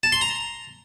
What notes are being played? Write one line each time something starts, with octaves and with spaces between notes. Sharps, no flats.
A5
C6
A#5